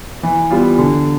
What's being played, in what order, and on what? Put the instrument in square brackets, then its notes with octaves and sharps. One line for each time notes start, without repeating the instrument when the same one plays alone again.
[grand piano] E3
G3 B3 F4
D3